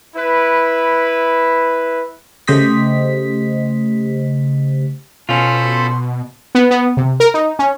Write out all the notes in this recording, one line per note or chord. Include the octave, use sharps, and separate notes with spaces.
E4 B4
C#3 A3 G4 C5 D#5 B6
B2 C#4 F4 A4 C5 B5 C6
B3
B3
C3
A#4
D#4
C#4